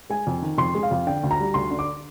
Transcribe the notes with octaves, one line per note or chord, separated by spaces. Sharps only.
G#3 G#5
F2
D#3
F2 C6
G#3
F5
F2
D3 G5
D2
A#5
G3
D2 C6
D3
D6